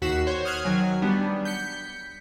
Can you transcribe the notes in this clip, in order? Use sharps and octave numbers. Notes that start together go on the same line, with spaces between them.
D#2 F#4 B6 C7 E7
C5 C#5
D#6 F6 F#6 G#6 C7
D#3 F#3 G#5
G3 B3 D4
G6 B6 C#7